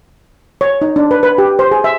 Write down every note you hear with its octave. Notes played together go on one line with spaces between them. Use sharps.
C#5
D#4
D4
B4
B4
G4
C5
G#4
E5